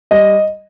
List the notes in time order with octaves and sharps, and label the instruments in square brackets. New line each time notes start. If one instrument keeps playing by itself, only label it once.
[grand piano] G3 D#5